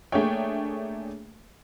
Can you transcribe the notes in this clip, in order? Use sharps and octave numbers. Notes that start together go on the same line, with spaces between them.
A3 A#3 D4 G#4 C#5 G5